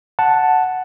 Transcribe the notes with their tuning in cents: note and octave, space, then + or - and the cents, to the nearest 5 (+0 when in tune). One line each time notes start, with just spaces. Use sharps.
F#5 +0 A5 +0